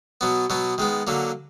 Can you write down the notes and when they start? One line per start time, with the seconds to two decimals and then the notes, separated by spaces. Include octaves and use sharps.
0.21 B2 F#3 B3
0.50 B2 F#3 B3
0.78 D#3 G#3 B3
1.07 D3 F#3 A#3